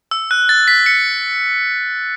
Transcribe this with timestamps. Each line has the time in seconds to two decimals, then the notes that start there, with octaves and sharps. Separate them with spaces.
0.11 E6
0.31 F#6
0.49 A6
0.68 B6
0.86 C#7